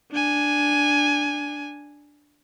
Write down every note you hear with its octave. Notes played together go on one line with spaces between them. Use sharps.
D4 G#5